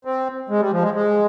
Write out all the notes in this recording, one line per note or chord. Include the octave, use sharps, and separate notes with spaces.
C4
G#3
G3
F3
G#3
G#3